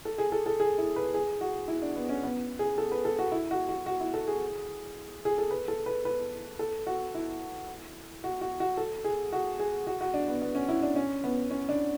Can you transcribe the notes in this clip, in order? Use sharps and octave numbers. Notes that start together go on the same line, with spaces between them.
A4
G#4
A4
A4
G#4
E4
B4
G#4
F#4
E4
D4
B3
C#4
B3
G#4
A4
B4
A4
F#4
E4
F#4
F#4
F#4
E4
A4
G#4
G#4
A4
B4
A4
B4
B4
A4
F#4
E4
F#4
F#4
F#4
A4
G#4
F#4
G#4
F#4
F#4
D4
B3
B3
C#4
E4
D4
C#4
B3
C#4
D4